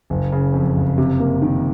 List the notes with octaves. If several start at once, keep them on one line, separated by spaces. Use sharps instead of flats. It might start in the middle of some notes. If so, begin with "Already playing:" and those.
F#1
C#3
F2
F#1
C3
A#3
D#3